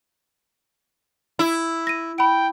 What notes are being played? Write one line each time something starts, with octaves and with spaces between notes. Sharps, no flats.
E4
A#6 D#7
G5 B5 D7